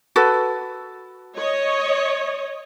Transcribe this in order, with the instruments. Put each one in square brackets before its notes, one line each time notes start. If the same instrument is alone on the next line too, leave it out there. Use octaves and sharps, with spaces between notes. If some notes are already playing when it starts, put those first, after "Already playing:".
[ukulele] F#4 A4 B4
[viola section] C#5 D#5